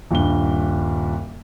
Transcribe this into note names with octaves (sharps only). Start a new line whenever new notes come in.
D#1 G2 G7